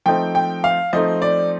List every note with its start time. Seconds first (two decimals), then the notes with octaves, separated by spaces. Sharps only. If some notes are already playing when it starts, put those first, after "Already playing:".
0.06 F3 A3 C4 D#4 G5
0.35 G5
0.64 F5
0.93 F3 A3 C4 D#4 D#5
1.22 D5